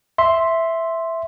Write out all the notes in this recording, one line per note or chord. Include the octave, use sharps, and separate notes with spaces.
E5 C6